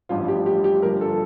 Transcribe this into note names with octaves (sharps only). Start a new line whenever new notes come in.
A1 G2 F3 F4
G4
G4
G4
G1 G2 F3 A#4
A4